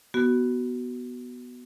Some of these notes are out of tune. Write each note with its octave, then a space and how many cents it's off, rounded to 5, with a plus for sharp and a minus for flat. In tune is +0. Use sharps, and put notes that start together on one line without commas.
B3 +0 F#4 +15